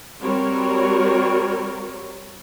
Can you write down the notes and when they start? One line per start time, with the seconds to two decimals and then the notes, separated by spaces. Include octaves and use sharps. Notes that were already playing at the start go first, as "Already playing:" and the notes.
0.22 G3 C4 F#4 A#4 C#5